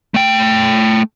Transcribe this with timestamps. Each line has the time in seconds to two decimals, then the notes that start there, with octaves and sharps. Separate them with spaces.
0.14 A3 G5